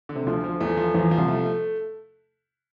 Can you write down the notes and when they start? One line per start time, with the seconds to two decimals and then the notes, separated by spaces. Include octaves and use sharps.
0.09 D3
0.15 C3
0.27 D2 D3 F3
0.44 F3
0.60 E2 E3 A3
0.77 F3
0.94 E2 E3 F3
1.11 F3
1.17 C2 C3
1.28 A3
1.45 A3